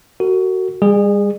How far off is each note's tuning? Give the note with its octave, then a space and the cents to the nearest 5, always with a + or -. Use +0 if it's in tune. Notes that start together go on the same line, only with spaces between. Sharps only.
F#4 +15 A#4 -40
G3 +40 G#4 -20